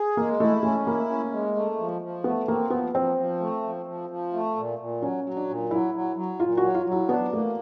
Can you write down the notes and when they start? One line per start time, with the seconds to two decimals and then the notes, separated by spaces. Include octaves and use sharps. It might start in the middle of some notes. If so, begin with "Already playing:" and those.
Already playing: G#4
0.17 G#3 A#3
0.40 A3 E4
0.63 A3 C#4
0.86 A#3 E4
1.09 C#4
1.32 G#3
1.56 A3
1.79 F3
2.02 F3
2.24 A3 B3
2.48 A#3 C4
2.70 F3 B3
2.94 F3 C4
3.17 F3
3.40 A3
3.63 F3
3.86 F3
4.10 F3
4.33 A3
4.56 A#2
4.79 A#2
5.01 F#3 C#4
5.24 F#3
5.37 D4
5.48 A#2
5.71 F#3 E4
5.94 F#3
6.16 F#3
6.40 A#2 F4
6.57 F#4
6.63 F#3
6.75 F4
6.86 F#3
6.91 E4
7.09 B3 D4
7.32 A3 A#3